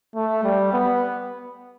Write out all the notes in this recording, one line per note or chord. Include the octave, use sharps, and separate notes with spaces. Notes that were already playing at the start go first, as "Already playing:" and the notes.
A3
G3
B3